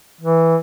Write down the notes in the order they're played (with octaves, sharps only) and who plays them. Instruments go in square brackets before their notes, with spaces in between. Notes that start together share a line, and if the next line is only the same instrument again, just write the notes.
[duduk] E3